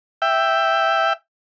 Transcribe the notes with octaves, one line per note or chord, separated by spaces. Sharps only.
E5 G5